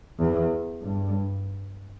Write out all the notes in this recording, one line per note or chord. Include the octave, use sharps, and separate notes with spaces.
E2
G2